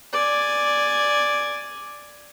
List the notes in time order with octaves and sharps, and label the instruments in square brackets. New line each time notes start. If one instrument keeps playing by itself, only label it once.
[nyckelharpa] D5 G#5